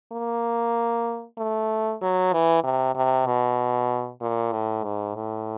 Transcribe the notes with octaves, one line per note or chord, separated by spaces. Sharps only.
A#3
A3
F#3
E3
C3
C3
B2
A#2
A2
G#2
A2